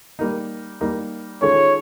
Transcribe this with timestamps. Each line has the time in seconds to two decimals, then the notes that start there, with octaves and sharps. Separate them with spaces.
0.19 G3 A#3 D#4
0.81 G3 A#3 D#4
1.41 D#3 G#3 C#4 F4 A4 C#5